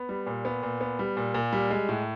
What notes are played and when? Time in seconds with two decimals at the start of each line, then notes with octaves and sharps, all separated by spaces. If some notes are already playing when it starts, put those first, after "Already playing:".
Already playing: B3
0.09 G3
0.27 A#2
0.45 B3
0.63 A#2
0.81 B3
0.99 G3
1.17 A#2
1.34 A#2
1.53 G3
1.70 G#3
1.89 A2